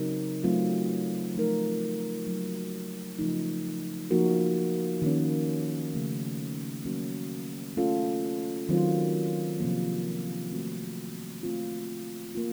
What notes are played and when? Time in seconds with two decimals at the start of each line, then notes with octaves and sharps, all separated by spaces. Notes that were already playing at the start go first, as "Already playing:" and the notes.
Already playing: C#3 F#3 C4 D#4 A#4
0.44 F#3 A3 C4 F4
1.35 F3 A3 D#4 A#4
2.27 F#3 A#3 D#4
3.19 C#3 F3 A3 D#4
4.10 F3 A#3 D#4 F#4 A#4
5.02 D#3 A#3 C#4
5.94 C#3 F3 A3
6.85 F#3 A#3 C#4 F#4
7.77 A3 C#4 F4 A4
8.69 D#3 F#3 C4 F4
9.60 C3 F3 A#3
10.52 A3 C4 F#4
11.43 A3 C4 F4
12.35 A#3 F4